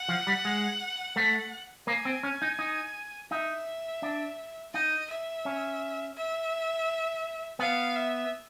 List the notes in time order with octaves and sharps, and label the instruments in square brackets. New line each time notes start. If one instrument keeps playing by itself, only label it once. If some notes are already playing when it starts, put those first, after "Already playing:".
Already playing: [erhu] F#5
[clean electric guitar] F3
G3
G#3
A3
[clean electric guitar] A#3 [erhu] G#5
[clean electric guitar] C4
C#4
D#4
D#4
[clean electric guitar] D#4 [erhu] E5
[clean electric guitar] D4
[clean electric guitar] D#4 [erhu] D#5
[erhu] E5
[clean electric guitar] C#4
[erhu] E5
[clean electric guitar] B3 [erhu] F5
[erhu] E5